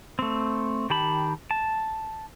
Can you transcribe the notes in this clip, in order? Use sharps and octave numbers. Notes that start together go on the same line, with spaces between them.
A3 C4
D#3 G4 A5 B5
A5